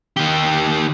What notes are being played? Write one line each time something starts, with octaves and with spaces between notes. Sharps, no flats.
D#3 G4